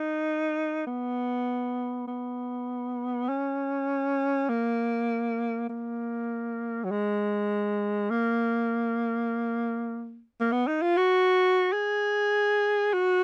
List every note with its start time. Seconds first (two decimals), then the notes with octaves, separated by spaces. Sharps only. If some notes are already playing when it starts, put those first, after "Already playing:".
Already playing: D#4
0.87 B3
2.08 B3
3.29 C#4
4.49 A#3
5.69 A#3
6.85 F#3
6.91 G#3
8.11 A#3
10.41 A#3
10.52 B3
10.67 D#4
10.82 F4
10.97 F#4
11.73 G#4
12.93 F#4